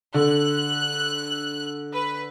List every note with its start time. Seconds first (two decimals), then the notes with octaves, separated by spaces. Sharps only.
0.14 D3 F#6
1.92 B4